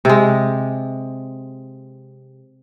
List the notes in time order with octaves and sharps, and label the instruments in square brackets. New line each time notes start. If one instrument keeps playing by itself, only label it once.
[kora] C3 G#3